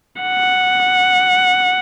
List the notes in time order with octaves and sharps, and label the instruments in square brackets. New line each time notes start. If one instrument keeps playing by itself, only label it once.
[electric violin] F#5